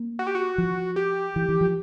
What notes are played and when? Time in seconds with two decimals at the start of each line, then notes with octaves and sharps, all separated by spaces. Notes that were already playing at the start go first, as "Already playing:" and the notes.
Already playing: A#3
0.19 F#4
0.27 G4
0.35 F#4
0.58 F3
0.96 G4
1.36 E3
1.49 E3
1.61 F3